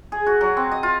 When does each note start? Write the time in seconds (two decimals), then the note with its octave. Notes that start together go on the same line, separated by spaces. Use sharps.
0.12 G#4
0.26 F#4
0.41 F#3
0.57 C4
0.71 D#5
0.83 F4